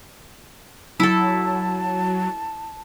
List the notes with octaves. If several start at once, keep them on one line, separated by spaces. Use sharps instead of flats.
F#3 E4 A4 A5